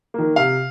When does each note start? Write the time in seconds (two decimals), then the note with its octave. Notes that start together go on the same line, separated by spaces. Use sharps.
0.14 D#3 A#3
0.36 C3 F5